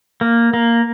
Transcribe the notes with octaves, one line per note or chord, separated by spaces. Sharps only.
A#3
A#3